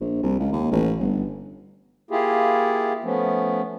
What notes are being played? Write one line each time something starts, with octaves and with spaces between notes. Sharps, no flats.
A#1
C2
C#2
D#2
A1
G1
A#3 E4 F4 G4 G#4
F3 A3 B3 C#4